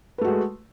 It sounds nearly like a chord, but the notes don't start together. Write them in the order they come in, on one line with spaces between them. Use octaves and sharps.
B4 A3 F#4 G#3